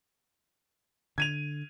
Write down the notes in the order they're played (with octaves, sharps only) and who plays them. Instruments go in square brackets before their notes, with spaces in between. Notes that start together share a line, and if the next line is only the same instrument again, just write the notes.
[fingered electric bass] D3 [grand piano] G#6 D#7 F7